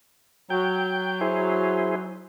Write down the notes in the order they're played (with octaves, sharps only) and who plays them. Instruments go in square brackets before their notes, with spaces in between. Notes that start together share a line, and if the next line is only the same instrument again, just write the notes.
[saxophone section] F#3 [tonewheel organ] G5
[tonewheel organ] E4 G#4 C5